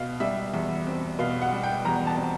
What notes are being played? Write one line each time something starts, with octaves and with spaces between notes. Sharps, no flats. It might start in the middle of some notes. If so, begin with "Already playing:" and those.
Already playing: B2 F5
G3 E5
E2
C4
B2 F5
F#5
G3
G5
E2 A#5
A5
C4